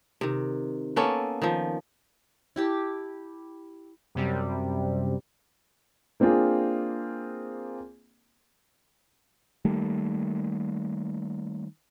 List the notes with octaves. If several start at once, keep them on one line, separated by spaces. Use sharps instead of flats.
C3 D#3
A#3 B3 C#4 A4
D#3 F3
E4 G4 A5
F#2 C3 G3
A#3 C4 D4 F4 G#4
D#3 G3 A3 A#3